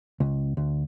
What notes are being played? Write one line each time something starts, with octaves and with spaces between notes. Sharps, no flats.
C#2
D2